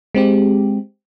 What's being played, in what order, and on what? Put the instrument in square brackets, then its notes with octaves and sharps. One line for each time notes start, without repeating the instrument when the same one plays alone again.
[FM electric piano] G#3 C4 G4